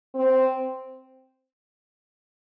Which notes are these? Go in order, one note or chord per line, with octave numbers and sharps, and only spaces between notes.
C4